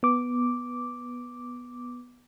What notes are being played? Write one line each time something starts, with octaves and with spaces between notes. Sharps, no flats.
B3 D6